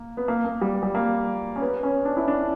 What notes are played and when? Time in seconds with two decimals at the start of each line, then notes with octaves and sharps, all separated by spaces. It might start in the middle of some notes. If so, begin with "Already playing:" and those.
Already playing: A#3
0.17 B3
0.28 A#3
0.45 A#3
0.61 G3
0.83 G3
0.95 A#3
1.56 C#4
1.61 B3
1.83 C#4
2.05 D4
2.17 E4
2.28 D4